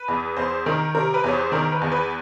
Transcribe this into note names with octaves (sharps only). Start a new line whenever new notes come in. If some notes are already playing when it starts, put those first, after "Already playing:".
Already playing: B4
E2
E2 C5
D#3 A#4
C3 A#4
B4
E2 C#5
C5
D#3 A#4
B4
E2
B4